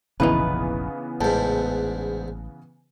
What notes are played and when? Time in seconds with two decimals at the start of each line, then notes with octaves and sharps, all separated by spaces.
0.20 F1 A#1 C#3 E3 B3 D#4 E4 B4
1.21 A1 E2 G#2 A4